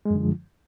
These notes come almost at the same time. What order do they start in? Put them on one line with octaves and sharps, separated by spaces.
G#3 F#2 D3 F3